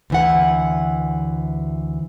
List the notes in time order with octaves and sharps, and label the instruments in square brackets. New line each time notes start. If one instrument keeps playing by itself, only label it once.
[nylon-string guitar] D2 E3 F#5